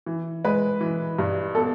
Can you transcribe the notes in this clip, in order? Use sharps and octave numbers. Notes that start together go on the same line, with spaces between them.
E3
G#3 B4
E3
G2
B3 A4